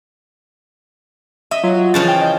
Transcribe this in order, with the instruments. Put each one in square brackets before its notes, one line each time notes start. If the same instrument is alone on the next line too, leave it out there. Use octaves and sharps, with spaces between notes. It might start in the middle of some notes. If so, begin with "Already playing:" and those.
[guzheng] D#5 [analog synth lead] E5
[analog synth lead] F#3 [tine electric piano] F4
[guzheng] C#3 E3 F3 [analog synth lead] A6
[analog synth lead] G5
[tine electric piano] D#5